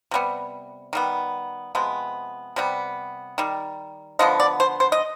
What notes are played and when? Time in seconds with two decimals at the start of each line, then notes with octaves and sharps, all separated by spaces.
0.11 C3 G3 B3
0.93 D#3 G3 B3
1.75 C3 F3 G#3 B3
2.56 C3 G3 B3
3.38 D#3 G3
4.19 D3 F3 B3 D#5
4.40 D5
4.60 C5
4.80 C5
4.92 D#5